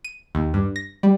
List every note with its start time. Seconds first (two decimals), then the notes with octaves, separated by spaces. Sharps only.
0.05 D#7
0.35 D#2
0.54 G2
0.76 A#6
1.03 G3